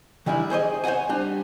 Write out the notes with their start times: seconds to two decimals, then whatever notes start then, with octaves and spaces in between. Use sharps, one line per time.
0.26 D#3 E3 G3 D4 E4
0.50 G#4 C5 C#5 D#5
0.84 C5 C#5 D#5 F#5 G#5
1.09 G3 D4